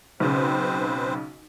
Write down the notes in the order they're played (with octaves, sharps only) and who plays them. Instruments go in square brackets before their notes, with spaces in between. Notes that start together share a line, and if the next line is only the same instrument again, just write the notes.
[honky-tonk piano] B1 C#3 [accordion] C4 B4 C5